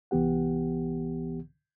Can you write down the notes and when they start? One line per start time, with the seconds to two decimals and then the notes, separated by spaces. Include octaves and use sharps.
0.11 C2 E3 B3 G4 F#5